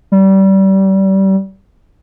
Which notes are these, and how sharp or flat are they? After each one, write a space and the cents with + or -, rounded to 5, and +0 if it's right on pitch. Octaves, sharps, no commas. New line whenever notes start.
G3 -25